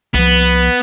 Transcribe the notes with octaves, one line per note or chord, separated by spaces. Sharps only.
C2 F3 B3